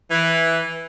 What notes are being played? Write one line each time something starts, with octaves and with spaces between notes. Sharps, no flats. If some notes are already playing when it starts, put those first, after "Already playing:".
E3